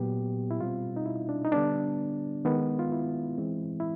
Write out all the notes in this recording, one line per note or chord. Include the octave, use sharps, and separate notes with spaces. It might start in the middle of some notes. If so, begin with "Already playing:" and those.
Already playing: A#2 F#3 B3 G4
E4
B2 G3 C4 F4
D#4
E4
D4
D#4
D3 G3 B3 D4
D#3 G#3 B3
F4
E4
E3 G#3 C4
E4